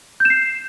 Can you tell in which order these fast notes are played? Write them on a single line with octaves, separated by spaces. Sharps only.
G6 E7 C7